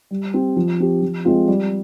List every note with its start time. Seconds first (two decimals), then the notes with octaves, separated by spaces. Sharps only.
0.11 G3
0.34 C4 G4
0.56 F3
0.80 C4 G4
1.02 F3
1.25 G#3 C4 F4
1.48 G3